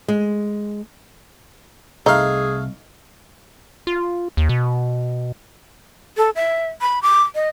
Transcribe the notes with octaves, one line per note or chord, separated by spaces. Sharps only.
G#3
C2 A3 D#4 G#4 F5
F4
D#2
B2
A4
E5
B5
D6
D#5